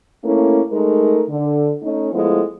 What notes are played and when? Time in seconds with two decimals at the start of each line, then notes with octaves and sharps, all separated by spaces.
0.24 A3 A#3 C#4 E4
0.71 G#3 A3 D#4 A#4
1.29 D3
1.82 A3 C#4 D#4
2.12 F3 G#3 A3 B3 E4